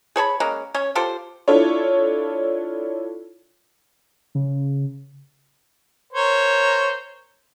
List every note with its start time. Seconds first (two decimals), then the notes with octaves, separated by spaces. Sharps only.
0.16 G#4 C#5 A5 B5
0.40 G#3 A#3 C#4
0.74 C#4 C#5
0.95 F4 G4 A4 C5
1.48 D4 E4 F4 A4 C#5
4.35 C#3
6.13 A#4 C5 C#5